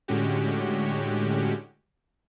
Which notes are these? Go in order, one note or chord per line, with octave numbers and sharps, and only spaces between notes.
A2 D3 G#3 C#4 F#4 G4